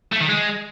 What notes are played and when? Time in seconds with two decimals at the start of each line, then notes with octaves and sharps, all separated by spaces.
0.13 A3
0.21 D#3
0.29 G#3